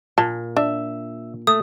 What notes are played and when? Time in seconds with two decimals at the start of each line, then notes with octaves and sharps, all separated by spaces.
0.18 A#2 A5
0.57 D4 E5
1.47 A3 D#6